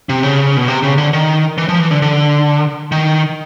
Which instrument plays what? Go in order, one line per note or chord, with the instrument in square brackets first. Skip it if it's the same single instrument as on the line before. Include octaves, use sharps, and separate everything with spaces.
[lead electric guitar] C3
C#3
B2
C3
C#3
D3
D#3
E3
F3
E3
D3
D3
D#3